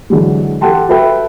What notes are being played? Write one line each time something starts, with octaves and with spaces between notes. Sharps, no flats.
D3 E3 F#3 G#3
G4 A4 F#5 G5 A5 C6
F#4 A4 B4 E5 G5